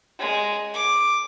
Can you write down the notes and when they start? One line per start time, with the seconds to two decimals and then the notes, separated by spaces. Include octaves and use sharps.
0.19 G#3
0.74 D6